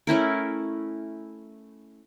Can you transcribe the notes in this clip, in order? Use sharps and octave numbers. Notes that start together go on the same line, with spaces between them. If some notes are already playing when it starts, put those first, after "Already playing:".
A3 C#4 E4 A#4